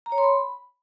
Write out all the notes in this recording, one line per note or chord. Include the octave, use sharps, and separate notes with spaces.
A#5
C#5
C6
B5